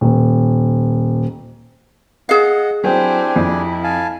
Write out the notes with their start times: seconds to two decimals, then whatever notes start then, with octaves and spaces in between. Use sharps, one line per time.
0.01 D#1
2.29 G#4 D#5 F5 F#5
2.84 F#3 C4 D4 E4 G4 G#5
3.36 F2 E4
3.83 F5 G#5 A5